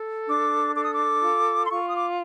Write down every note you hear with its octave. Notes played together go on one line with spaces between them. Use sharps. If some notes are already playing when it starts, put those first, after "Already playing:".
Already playing: A4
D4 D6
A4 D6
D#6
D6
F4
C6
F4 C#6
D#6
D6